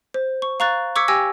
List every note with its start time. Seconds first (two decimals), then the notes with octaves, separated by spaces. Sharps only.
0.14 C5
0.42 C#6
0.60 F5 A#5 C#6 F#6 A6
0.96 C#6 D6 E6 G#6 B6 C#7
1.08 G4 G5 G#5 E6 G#6 A#6